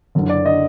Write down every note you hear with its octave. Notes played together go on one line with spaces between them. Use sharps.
F#1 F#2 D3
D5
D3 D#5